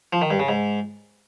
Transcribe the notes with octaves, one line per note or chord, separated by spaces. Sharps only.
F3
D#3
G2
C#3
G#2